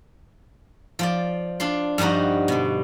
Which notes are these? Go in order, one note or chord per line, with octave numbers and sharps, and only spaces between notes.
F3 F4 D5
D4 F4 C6
G2 F3 G3 D#4 F#4
B2 D3